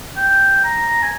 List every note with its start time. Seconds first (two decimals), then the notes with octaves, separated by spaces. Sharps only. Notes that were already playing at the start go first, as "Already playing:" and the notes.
0.17 G5
0.64 A#5
1.03 G#5